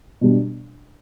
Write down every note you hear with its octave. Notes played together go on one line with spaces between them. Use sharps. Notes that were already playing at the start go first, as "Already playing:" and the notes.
B2 G3 D4